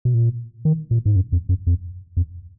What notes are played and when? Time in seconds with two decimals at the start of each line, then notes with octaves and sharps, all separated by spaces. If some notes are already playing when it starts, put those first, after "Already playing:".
0.05 B2
0.14 A#2
0.65 D#3
0.91 A#2
1.06 G#2
1.16 F#2
1.32 F2
1.49 F#2
1.67 F2
2.17 F2